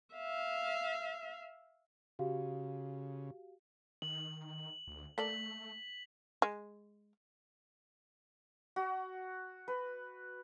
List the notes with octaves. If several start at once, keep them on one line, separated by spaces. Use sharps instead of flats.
E5 F5
C#3 F#4 G4 F5
D#3 F#7
D2
A3 A#3 A4 D5 B6 F#7
G#3
F#4
B4